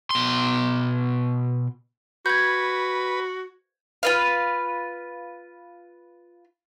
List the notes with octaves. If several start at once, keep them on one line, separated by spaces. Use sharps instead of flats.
B2 C6
F#4 B4 G6 G#6
F4 B4 F5